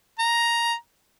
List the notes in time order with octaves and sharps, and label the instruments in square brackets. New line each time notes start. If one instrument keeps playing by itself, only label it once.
[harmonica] A#5